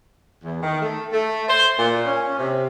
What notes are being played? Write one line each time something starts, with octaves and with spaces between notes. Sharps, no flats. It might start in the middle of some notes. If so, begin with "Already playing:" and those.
E2
D#3
A3
A3
C5
A#2
C#4
C3